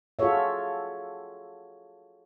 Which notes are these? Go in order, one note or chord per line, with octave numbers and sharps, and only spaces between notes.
F4 F#4 G#4 A4 C#5 E5